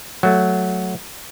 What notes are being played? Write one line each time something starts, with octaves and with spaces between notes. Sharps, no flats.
F#3 A3